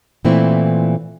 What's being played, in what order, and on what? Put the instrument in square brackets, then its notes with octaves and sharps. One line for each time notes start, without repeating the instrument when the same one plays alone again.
[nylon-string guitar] A#2 E3 A3 C4 E4